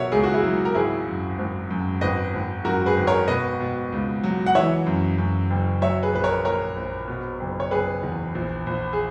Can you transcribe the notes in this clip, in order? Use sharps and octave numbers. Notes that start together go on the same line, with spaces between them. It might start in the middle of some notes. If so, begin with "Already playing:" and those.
Already playing: B2 F#3 F#4 A#4 C#5 E5
C#2 G#4
F#4
E4 G#4
F#3
A#4
G#1 E4 G#4
F#2
G#1
F#2
G#1 B4 D#5
G#1
F#2 F#4 A#4
G#4 B4
G#1
A#4 C#5
B2 B4 D#5
B2
C#2
F#3
F#5
E3 C#5 E5
F#2
F#2
F#1
F#3 C#5 E5
G#4 B4
A#1 B4
A#4 C#5
A#1 A#4 C#5
A#1
B2
F#1
C#5
F#1 G#4 B4
E2
A#1
A#1
G#4